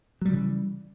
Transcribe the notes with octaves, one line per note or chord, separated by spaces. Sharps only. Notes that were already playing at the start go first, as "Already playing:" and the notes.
C#3 E3 F#3 G3